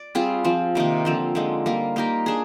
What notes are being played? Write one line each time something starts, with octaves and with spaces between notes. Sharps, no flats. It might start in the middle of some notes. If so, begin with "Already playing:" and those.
Already playing: D5
G3 C4 F4 G#4
F3 C4 F4
C3 D#3 A#3 D#4
D3 F3 C4 F4
D3 F3 G#3 D#4
G3 A#3 F4
A#3 D#4 G4 A#4
D4 G#4